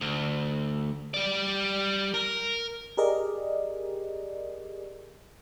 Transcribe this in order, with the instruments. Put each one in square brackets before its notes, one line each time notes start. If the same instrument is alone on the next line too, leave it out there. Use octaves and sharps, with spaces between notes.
[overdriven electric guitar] D2
G3 D5
A#4
[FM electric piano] G4 G#4 A#4 D5 D#5